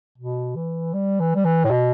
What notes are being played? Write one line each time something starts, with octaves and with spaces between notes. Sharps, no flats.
B2
E3
G3
E3
G3
E3
A2
B2